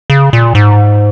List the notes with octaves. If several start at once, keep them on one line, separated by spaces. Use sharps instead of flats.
C#3
A#2
G#2